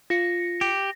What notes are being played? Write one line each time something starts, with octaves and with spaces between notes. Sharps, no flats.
F4 A#6 C#7
G4